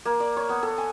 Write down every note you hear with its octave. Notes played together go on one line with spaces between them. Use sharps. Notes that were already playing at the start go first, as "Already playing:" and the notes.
A#3
D5
C#5
B3
A4
G#5